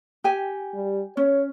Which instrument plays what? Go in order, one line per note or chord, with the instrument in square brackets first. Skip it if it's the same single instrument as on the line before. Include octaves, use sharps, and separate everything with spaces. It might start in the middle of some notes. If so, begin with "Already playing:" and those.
[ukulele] G4 G#5
[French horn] G3
[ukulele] C#4 [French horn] C#5